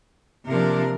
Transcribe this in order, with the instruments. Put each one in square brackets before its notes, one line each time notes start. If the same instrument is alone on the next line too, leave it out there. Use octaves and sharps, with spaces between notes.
[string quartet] C3 F3 A#3 D4 A#4